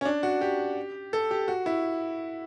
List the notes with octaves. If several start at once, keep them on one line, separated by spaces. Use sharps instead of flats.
C#4
D4
F#4
G4
A4
G4
F#4
E4